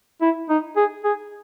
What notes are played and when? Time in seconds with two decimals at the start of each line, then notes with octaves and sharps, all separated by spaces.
0.22 E4
0.49 D#4
0.76 G#4
1.04 G#4